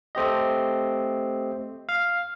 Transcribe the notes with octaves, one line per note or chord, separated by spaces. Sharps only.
A3 C4 G4 D#5
F5